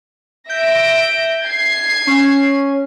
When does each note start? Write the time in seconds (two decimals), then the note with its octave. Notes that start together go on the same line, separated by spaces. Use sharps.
0.49 E5 G6 A#6 D7
1.46 G#6 C7
2.07 C#4